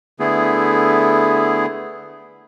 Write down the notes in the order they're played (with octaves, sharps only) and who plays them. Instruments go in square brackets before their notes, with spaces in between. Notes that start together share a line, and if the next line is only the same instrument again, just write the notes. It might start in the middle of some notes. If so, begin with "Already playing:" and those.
[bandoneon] D3 A3 B3 E4 G#4